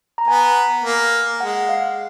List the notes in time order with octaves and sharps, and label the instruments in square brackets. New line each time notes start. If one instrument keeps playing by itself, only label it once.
[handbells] A#5
[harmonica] B3 [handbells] G#5
[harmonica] A#3
[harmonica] G#3 [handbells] F#5
[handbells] F5